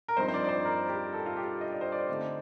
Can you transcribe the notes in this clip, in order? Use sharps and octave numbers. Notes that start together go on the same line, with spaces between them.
A#4
G2 F3 C4 D#4 C5
C5
D5
D5
C5
A#4
G4
A4
F4
G4
D#5
D5
C5
D5
D3 A3 C4 D#4